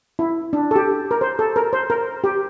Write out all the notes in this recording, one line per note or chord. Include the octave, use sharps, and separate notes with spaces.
E4
D4
A4
G4
A#4
C5
A4
A#4
C5
A#4
G4